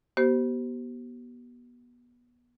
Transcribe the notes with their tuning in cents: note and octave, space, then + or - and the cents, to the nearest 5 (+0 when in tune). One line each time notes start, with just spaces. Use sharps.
B3 -25 G4 -35 C5 +0